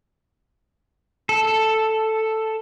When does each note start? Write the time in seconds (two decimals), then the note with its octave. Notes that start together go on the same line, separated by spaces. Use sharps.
1.29 A4